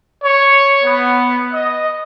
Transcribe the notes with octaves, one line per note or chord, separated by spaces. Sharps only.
C#5
B3
D#5